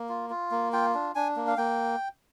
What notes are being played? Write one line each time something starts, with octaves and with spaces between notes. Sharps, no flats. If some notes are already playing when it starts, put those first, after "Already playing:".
Already playing: A#3
F4
F4
A#3
F4 G5
D4
D4 G#5
A#3
F5
A#3 G5